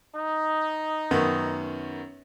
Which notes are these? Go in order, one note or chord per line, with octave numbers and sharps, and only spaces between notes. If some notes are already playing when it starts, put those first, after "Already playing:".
D#4
F#2 D#3 B3